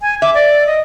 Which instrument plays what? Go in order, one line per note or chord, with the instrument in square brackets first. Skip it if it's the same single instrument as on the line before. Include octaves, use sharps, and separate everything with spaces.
[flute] G#5
[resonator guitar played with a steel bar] E5 [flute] D6
[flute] D5
D#5